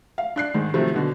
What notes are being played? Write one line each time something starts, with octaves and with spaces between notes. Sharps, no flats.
F5
D4 F#6 C7
G#2 D#3
C3 D#3 F3 F#3 A3
B2 D3 F#4